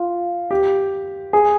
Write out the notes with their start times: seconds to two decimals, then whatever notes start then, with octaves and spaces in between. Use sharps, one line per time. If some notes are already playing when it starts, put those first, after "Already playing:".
Already playing: F4
0.51 G4
1.33 G#4